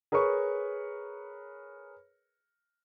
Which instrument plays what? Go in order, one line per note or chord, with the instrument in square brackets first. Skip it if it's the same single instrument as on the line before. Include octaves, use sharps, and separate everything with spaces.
[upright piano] G#4 A#4 B4 C#5 C#6